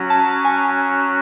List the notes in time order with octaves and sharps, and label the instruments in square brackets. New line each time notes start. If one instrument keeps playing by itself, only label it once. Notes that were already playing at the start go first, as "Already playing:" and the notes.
Already playing: [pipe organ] F#3 C#4 F#4
[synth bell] A5
G#5